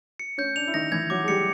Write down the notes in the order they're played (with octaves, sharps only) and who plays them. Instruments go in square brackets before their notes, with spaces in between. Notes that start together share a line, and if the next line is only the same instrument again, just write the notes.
[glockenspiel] C#7
[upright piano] C#4 [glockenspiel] G6
[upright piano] D4 [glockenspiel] F7
[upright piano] E4
[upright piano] D#3 D#4 [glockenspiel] A#6
[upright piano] E3 E4 [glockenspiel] G#6
[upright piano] F#3 F#4 [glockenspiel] D6
[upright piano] G#4
[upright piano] G3 G4 [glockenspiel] C#7